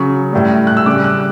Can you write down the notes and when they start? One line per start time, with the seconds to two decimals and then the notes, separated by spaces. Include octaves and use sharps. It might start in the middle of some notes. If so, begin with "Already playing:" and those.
Already playing: C#3 F#3 C#6
0.33 A2 G3
0.67 F#6
0.77 E6
0.86 C#3 G3 D6
1.04 F#6